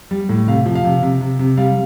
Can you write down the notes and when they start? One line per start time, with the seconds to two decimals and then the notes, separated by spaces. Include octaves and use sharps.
0.11 G3
0.29 A2
0.48 C3 F5
0.66 F3
0.75 F5
0.85 C3
1.02 C3
1.21 C3
1.39 C3
1.57 G3 F5